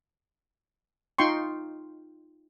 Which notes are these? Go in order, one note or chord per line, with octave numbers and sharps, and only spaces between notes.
D#4 F4 G5 C6 C#6